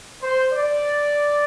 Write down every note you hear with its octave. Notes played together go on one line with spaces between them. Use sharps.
C5
D5